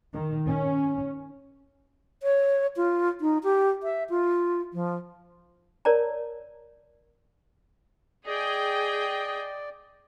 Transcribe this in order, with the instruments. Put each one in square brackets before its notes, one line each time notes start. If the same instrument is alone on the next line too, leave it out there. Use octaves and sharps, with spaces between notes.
[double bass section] D#3
C#4
[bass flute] C#5
F4
D#4
G4
E5
F4
F3
[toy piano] A#4 C#5 D5 A5 A#5
[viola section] G#4 G5 [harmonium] D5 [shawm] D#5